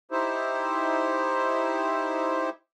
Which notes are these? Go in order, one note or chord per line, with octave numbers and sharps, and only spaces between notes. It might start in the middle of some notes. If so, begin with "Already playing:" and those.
D#4 E4 G4 C5 E5